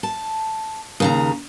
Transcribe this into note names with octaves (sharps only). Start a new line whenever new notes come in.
A5
D#2 C#3 A#5